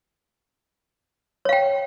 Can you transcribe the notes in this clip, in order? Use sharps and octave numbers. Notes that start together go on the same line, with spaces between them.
C#5 F5 G5